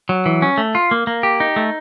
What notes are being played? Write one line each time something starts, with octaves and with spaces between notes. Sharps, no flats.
F#3
E3
C#4
A3
F4
A#3
A#3
G4
D#4
A3